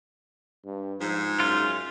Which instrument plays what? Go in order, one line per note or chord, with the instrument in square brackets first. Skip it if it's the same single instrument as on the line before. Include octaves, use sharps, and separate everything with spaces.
[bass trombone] G2
[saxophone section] G#2 [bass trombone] F3
[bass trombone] F#2 [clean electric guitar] F4